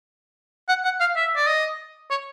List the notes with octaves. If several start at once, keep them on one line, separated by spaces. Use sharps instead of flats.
F#5
F#5
F5
E5
D5
D#5
C#5